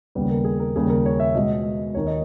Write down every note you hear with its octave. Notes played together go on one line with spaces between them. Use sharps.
D#2 C#3 G3 B3 B4
A#4
G#4
A#4
D#2 C#3 G3 G#4
A#4
C#5
E5
B2 G#3 B3 D#5
D#2 D#3 A#3 C#5
D#5